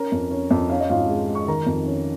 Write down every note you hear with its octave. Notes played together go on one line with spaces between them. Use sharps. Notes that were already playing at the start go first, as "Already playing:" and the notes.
Already playing: C#4 A#4 A#5
F2
C#4
F2
C#4 F5
D#5
G#1 F4 F5
G#3
G#3
C#6
D#3 A#4 A#5
F2
C#4